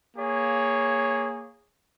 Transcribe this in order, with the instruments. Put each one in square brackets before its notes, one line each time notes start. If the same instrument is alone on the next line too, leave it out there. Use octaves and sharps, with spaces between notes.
[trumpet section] A#3 G#4 C#5